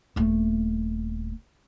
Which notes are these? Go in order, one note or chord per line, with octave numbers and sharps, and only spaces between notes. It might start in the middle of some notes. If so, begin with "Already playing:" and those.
D#1 A3